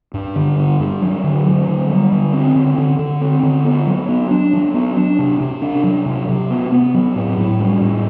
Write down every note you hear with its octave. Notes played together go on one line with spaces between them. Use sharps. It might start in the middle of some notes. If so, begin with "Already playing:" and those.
G2
D3
G2
G2
F#3
D3
F#3
D3
G3
D3
C4
D3
D3
D3
C4
D3
B3
F#3
B3
D4
F#3
B3
D4
C3
C3
D4
F#3
C3
C3
B3
B3
F#3
A2
A2
G3
A2